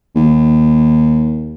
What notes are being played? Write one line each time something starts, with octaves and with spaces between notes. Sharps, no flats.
D#2